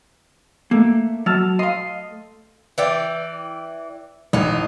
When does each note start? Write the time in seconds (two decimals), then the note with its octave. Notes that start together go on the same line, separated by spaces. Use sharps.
0.71 A3 A#3
1.26 F#3 A5 E6 F6
1.59 D#5 F5 C6
2.78 E3 D5 G5
4.33 A1 A2 D#4